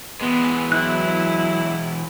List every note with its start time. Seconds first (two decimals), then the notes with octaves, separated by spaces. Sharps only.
0.21 E3 G#3 B3
0.72 F#3 E4 F#6